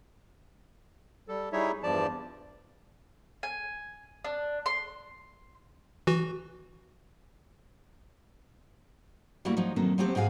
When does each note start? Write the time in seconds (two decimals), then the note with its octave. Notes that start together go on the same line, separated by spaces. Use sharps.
1.28 G3 A4
1.52 G3 D#4 E4 G#4 C#5 E5
1.83 E2 G2 F3 D5 A5
3.43 G#5
4.25 D4
4.66 C6
6.07 E3 F#4
9.45 G3 A3 A#3 E4 F#4 E5
9.57 F3 F#3 D#4
9.76 B2 D#3 F#3 A3 A#3 C4
9.98 F3 F#3 A3 B3 C4 G4
10.15 G#2 B3 F#4 G#4 B4 F5